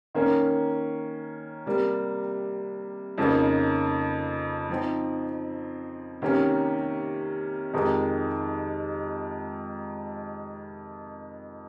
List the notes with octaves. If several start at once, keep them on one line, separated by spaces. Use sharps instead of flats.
D#3 A#3 C#4
C3 G3 A#3
F2 C#3 F3 A#3 D#4
F3 C4 D#4
C3 D#3 A#3 C#4
F2 C3 D#3 G#3 D#4